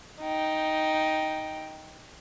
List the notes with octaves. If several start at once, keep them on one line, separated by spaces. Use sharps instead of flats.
D#4 G5